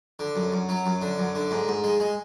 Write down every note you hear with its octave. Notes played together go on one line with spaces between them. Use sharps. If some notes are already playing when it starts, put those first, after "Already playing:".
D3
F#2
F#2
F#3
F#2
D3
F#2
D3
G#2
G#2
G#3
G#3